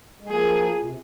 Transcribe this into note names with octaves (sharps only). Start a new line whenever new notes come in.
G#3
F3 A#3 G#4
A#2
C3